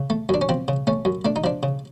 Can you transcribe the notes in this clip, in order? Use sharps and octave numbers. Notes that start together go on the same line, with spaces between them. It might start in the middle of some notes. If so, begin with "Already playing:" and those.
Already playing: C#3
A3
F#2 D4
C#4
F3 C4
C#3
A3 C#4
F#2
A3 D4
D#4
F3 D4
C#3